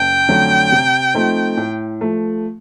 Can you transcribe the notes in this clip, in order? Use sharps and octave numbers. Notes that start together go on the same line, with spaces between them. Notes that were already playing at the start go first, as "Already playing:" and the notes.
Already playing: F#1 G5
F2 D3 F#3 A3
C3
F3 A3 C4 D#4
A2
F3 A3